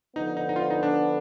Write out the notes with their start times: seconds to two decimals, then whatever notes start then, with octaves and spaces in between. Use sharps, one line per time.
0.15 D3 F3 B3 D#4
0.37 D#4
0.49 D#4
0.56 F4
0.70 D#4
0.83 D4